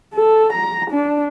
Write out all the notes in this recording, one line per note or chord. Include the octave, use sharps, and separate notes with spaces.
A4
A#5
D4